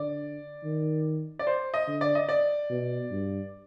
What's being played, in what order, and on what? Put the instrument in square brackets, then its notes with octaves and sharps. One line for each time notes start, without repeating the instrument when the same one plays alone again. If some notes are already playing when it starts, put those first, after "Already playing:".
Already playing: [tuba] D3 [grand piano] D5
[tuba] D#3
[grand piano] D5
C5
D#5
[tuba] D3
[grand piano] D5
D#5
D5
[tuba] B2
G2